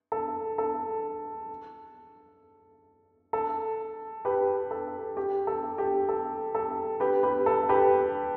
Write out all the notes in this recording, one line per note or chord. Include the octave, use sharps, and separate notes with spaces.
A4
A4
A4
G4 B4
A4
G4
A4
G4
A4
A4
G4 B4
G4 B4
A4
G4 B4